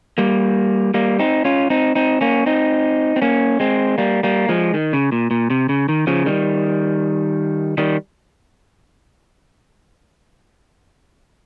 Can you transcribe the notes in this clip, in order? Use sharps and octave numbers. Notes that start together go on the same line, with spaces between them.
G3 A#3
G3 A#3
C4 D#4
C#4 F4
C4 D#4
C4 D#4
A#3 C#4
C4 D#4
C4
A#3 C#4
G#3 C4
G3 A#3
G3 A#3
F3 G#3
D#3
C#3
A#2
A#2
C3
C#3
D#3
C#3 F3
D#3 G3
D#3 G3